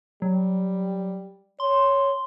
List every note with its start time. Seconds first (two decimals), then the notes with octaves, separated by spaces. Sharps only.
0.22 F#3 G3
1.60 C#5 C6